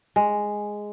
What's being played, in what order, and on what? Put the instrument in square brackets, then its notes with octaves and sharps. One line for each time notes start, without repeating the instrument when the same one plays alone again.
[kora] G#3